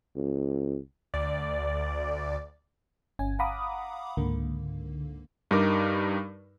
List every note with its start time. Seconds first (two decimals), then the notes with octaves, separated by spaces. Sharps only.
0.16 C#2
1.14 D2 D5
3.19 G1 C#4 G#5
3.39 F5 F#5 A#5 B5 D6 D#6
4.17 C#2 G#2 D3 A#3
5.51 G2 G3 D#4 A#4 D6